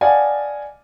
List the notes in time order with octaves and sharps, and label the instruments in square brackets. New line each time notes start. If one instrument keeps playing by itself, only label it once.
[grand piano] D5 D#5 F5 F#5 G#5 A5